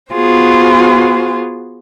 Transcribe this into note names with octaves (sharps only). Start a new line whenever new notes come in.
B3 F4 F#4 G#4 C5